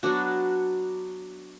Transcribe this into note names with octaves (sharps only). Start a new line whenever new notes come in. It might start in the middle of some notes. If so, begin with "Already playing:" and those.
F#3 B3 D4 F#4